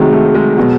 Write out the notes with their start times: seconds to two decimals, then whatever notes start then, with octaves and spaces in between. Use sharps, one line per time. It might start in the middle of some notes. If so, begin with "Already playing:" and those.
Already playing: C3 D#3 F#3 G#3 A3
0.13 A3
0.35 G#3
0.57 B2 F#3